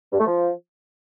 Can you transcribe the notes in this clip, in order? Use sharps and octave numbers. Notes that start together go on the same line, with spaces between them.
G2
A3
F3